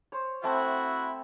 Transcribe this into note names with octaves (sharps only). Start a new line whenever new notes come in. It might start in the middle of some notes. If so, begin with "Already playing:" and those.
C5 C#5
A3 C4 E4 F#4 A5